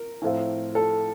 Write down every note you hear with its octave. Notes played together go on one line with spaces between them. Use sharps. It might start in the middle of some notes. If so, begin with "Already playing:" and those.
Already playing: A#4
A2 F3 A3 C4 F4
A4